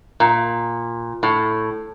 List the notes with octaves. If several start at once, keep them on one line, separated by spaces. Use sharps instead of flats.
A#2
A2